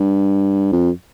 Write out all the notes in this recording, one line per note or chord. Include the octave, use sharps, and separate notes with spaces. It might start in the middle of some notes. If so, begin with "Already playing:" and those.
Already playing: G2
F2